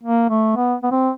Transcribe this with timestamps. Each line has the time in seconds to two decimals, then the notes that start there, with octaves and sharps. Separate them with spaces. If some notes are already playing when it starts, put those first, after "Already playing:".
0.03 A#3
0.30 A3
0.56 B3
0.83 B3
0.92 C4